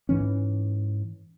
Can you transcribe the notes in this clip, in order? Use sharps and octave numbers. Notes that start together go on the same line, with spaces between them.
G#2 E3 C#4